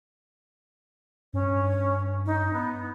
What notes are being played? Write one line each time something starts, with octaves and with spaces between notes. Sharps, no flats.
G2 C#4
D#4
B3